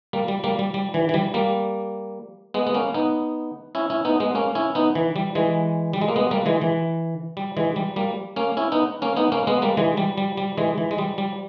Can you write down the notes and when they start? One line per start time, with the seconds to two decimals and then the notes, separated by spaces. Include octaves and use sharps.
0.13 G3 A#3
0.28 G3
0.44 G3 A#3
0.59 G3
0.74 G3
0.94 E3
1.09 E3
1.14 G3
1.34 G3 A#3
2.54 G#3 B3
2.67 B3
2.75 A#3 C#4
2.94 B3 D#4
3.75 C#4 E4
3.90 C#4 E4
4.05 B3 D#4
4.20 G#3 B3
4.35 A#3 C#4
4.55 C#4 E4
4.75 B3 D#4
4.95 E3
5.16 G3
5.35 E3 G#3
5.93 G3
6.01 G#3
6.08 A#3
6.16 G#3 B3
6.31 G3 A#3
6.46 E3 G#3
6.61 E3
7.37 G3
7.57 E3 G#3
7.76 G3
7.96 G3 A#3
8.36 A#3 C#4
8.57 C#4 E4
8.72 B3 D#4
9.02 A#3 C#4
9.17 B3 D#4
9.32 A#3 C#4
9.47 G#3 B3
9.62 G3 A#3
9.77 E3 G#3
9.97 G3
10.18 G3
10.37 G3
10.57 E3 G#3
10.78 E3
10.91 G#3
10.98 G3
11.18 G3